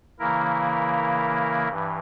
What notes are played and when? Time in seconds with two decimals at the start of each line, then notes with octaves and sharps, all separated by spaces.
0.19 C#3 E3 A#3 E4 A#4
1.69 G2 E3